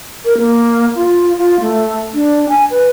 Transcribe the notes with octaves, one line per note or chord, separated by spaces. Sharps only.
A#4
A#3
F4
F4
A3
D4
G#5
B4